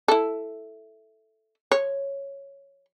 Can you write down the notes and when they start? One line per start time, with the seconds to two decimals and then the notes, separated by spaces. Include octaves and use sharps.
0.08 E4 A4
1.72 C#5